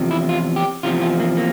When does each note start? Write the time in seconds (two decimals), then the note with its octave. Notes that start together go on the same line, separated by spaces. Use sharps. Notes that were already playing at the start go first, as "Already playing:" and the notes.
Already playing: E2 C3 F3
0.11 E4
0.29 F4
0.56 G4
0.83 E2 C3 F3 F4
1.01 F4
1.20 A#3
1.37 A#3